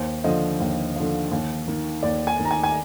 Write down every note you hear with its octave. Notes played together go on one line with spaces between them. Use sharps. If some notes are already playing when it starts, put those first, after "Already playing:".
Already playing: D#2 C5
D3 F3 D#5
D#2
D3 F3
D#2
D#3
D#2 D5
G#5
D#3
A#5
G#5
G#5